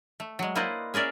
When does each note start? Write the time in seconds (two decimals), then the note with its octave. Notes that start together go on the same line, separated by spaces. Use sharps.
0.20 A3
0.39 F#3 G#3
0.55 A#3 E4 B4 C5 D5 D#5
0.94 C#4 G#4 A#4 D5 E5